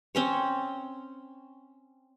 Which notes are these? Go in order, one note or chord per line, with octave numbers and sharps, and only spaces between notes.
C4 C#4 C#5